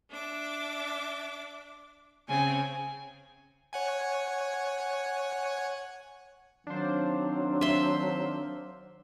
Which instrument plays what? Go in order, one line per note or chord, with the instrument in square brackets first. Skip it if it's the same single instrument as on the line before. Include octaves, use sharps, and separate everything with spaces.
[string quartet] D4 E5 D6
[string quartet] C#3 C4 [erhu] G#5
[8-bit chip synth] C#5 F#5 G#5
[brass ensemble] D#3 C4 F5 [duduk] F#3 [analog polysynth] D4 C5
[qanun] E5 C6